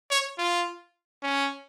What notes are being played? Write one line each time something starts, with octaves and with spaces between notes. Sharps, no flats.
C#5
F4
C#4